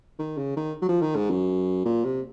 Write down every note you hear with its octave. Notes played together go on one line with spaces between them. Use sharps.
D#3
C#3
D#3
F#3
F3
D#3
G#2
F#2
A#2
C3